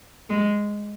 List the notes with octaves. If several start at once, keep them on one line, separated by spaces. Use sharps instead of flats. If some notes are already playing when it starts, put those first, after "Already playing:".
G#3